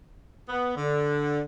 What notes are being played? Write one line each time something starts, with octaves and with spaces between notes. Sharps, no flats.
B3
D3